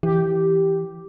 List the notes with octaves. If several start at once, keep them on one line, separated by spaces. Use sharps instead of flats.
E3 G4